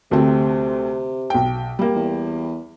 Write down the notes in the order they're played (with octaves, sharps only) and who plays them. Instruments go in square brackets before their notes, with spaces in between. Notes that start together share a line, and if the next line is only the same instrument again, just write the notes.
[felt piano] D2 A3 C4 [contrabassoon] C3
[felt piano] B1 G5
G3 A#3
[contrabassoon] E2